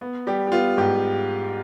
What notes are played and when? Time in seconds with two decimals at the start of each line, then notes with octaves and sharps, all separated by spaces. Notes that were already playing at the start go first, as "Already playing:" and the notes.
0.01 B3
0.27 G3 G4
0.47 G4
0.52 B3 F4
0.77 G#2 G4